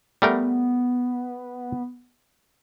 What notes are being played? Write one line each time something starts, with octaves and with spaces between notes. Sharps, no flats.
G3 A3 B3 A#4